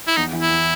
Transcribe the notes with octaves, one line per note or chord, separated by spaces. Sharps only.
E4
E2 D#4
E3
E4
E2